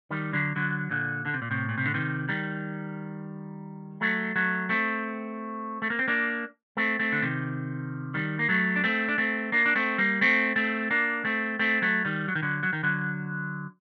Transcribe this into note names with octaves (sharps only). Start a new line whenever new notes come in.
D#3 G3
D3 F#3
D3 F#3
A#2 D3
D3
C3
A#2
A2 C3
A#2
C3
D3
C3 D#3
D#3 G3
F#3 A3
F#3 A3
A3 C4
A3
A#3
C4
A#3 D4
A3 C4
A3 C4
D3
C3 D#3
D#3 G3
A#3
F#3 A3
D4
A3 C4
D4
A3 C4
A#3 D4
D4
A3 C4
G3 A#3
A3 C4
A3 C4
A#3 D4
A3 C4
A3 C4
F#3 A3
D#3 G3
F#3
D#3
D3 F#3
F#3
D#3
D3 F#3